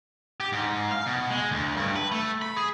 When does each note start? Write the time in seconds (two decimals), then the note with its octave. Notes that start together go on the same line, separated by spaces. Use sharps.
0.40 G4
0.52 G#2
0.92 F5
1.06 B2
1.30 G#3
1.51 D2
1.77 G2
1.96 B4
2.12 A3
2.42 B5
2.57 G#4